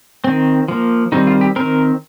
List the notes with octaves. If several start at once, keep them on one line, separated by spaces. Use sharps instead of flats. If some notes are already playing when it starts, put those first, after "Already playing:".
D#3 C4
F3 A#3
D#3 G3 C4 D#4
F4
G4
D#3 C4 A#4